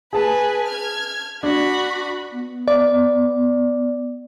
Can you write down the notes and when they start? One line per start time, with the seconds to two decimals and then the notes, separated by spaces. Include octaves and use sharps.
0.13 G#4 B4 G#5 A5
0.68 F6 G#6
1.43 D4 F#4 B5
2.32 B3
2.68 D5